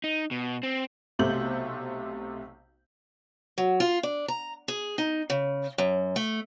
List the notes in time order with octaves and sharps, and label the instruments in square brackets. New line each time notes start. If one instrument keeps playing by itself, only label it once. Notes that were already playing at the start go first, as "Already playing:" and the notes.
[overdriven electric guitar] D#4
B2
C4
[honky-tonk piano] B1 C3 A3 C5 G6 F#7
[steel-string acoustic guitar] F#3
F4
D4
A#5
G#4
D#4
C#3
F#2
A3